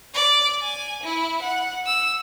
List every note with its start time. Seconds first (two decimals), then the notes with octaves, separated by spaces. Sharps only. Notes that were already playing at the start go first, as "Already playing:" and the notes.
0.14 D5
0.63 G#5
1.03 E4
1.42 F#5
1.86 E6